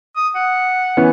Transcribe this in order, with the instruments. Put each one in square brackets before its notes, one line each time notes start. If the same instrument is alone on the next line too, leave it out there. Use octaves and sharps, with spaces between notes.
[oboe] D#6
F#5
[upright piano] E3 B3 C#4